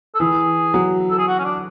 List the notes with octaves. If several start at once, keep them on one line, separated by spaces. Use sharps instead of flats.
A4
E3 G#4
F#3
A4
G#4
F#4
C#4
D4